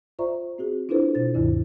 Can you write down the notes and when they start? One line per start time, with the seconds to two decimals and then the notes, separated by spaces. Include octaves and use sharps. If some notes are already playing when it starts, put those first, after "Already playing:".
0.19 F4 C5 D5 E5 A#5 C#6
0.58 C4 F#4 G#4
0.89 D4 E4 F4 A4 B4 C5
1.15 B2 F4 C5 A6
1.34 D2 G2 D#3 E4 D5